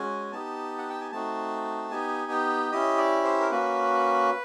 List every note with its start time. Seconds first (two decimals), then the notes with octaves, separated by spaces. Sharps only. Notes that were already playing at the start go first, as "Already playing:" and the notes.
Already playing: G#3 C#4 F#4 G#5
0.32 B3 D#4 G4 A5
0.78 F#5
0.90 G5
1.01 G#5
1.12 A3 C4 D#4 F#4 A5
1.91 B3 D#4 G4 G#5
2.31 G5
2.71 C#4 E4 G4 D#5
2.98 D5
3.24 C5
3.41 A#4
3.51 A#3 C#4 F#4 B4